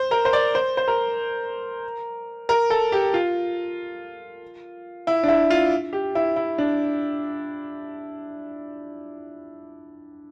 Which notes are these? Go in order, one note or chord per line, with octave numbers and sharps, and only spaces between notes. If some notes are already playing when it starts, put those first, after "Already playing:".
Already playing: C5
A#4
C5
D5
C5
C5
A#4
A#4
A4
G4
F4
E4
D4
E4
F4
G4
E4
E4
D4